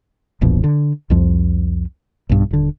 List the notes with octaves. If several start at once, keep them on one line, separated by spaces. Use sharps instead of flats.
D1 A#1 F2 B2
D3
C2 F2 F3
B1 G2
D#1 D3